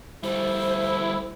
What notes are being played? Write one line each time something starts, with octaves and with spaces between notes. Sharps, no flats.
G3 A3 E4 C5